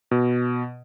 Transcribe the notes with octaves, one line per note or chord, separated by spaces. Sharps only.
B2